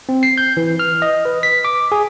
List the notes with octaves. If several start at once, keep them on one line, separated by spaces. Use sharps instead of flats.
C4
C7
G6
E3
F6
D#5
B4
B6
D6
G#4